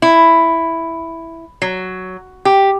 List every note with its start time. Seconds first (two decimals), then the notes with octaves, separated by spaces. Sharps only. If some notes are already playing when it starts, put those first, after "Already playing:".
0.02 E4
1.62 F#3
2.45 G4